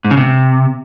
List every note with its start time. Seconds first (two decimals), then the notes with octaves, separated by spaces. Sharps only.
0.04 G#2
0.11 C#3
0.17 C3